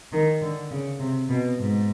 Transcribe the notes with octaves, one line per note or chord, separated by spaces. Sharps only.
D#3
D3
C#3
C3
B2
G#2